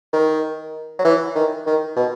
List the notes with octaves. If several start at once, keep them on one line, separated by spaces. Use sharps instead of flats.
D#3
F#3
E3
D#3
D#3
B2